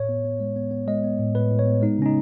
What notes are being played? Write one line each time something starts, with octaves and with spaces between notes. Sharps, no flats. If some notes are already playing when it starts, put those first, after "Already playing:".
Already playing: A2 C#5
B3
B3
G#3
B3
B3
G#3 D#5
B3
A2
A2 B4
A2
C#5
B3
G#3 D#4
C#3 C#4
D#4